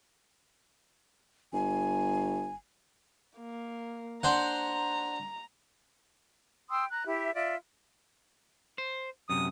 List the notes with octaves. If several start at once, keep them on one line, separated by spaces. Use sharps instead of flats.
G1 G#5
A#3
D4 C5 F#5 A#5
G5 C6 D#6 E6
A#5 F#6
E4 G4 E5
F4 D5 E5
C5
F#2 C3 D#6